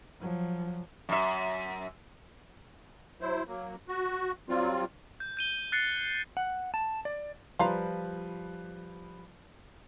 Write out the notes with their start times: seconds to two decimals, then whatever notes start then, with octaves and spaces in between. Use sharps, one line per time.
0.20 F3 F#3
1.09 F#2 E5
3.21 F#3 E4 C5
3.47 F#3 A#3
3.88 F#4
4.49 F#3 G3 C4 F4
5.20 G6
5.37 G6 D#7 G7
5.72 F#6 A6 C7 C#7
6.37 F#5
6.74 A5
7.05 D5
7.59 F3 G3 F4 B4 F5 A#5